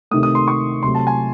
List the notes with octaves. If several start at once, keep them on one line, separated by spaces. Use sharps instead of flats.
C3 D#3 A3 D#6
D#6
C6
C#6
C3 F#3 A3 C6
A5
G#5